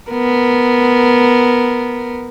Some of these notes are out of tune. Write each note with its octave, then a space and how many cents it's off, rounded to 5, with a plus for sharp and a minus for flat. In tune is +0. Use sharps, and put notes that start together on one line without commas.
B3 +0 A#4 +0